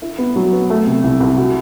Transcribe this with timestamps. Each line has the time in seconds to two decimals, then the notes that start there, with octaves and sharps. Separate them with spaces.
0.02 E4
0.18 B3
0.36 F#3
0.53 B3
0.70 A3
0.87 C3
1.04 C2
1.20 C2
1.38 F#4